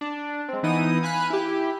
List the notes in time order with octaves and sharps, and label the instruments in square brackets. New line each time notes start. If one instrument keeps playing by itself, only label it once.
[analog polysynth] D4
G#3 C4
E3 B3 D#4 E4 D#6
F5 G#5 B5 F#6
E4 G4